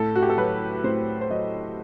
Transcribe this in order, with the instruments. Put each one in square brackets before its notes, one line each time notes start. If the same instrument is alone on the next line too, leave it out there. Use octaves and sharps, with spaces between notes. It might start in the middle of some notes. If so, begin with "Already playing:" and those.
Already playing: [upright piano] A2 A4
F#4
G4
A4
F#3 B4
A2 C5
C5
F#3 D#5